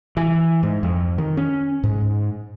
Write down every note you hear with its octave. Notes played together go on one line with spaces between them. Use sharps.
E3
G#2
F2
D#3
C#4
G#2